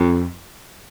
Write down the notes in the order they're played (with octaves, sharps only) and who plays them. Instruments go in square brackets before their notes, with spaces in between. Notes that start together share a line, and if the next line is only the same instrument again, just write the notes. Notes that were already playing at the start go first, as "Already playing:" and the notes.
Already playing: [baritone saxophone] F2